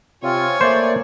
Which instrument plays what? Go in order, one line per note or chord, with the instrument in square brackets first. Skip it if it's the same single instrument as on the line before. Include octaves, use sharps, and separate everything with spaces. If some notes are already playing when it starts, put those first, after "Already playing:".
[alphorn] C3 [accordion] C4 F4 [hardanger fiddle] C#5 G#5
[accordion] A3 D5 [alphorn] A#3 [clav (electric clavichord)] C5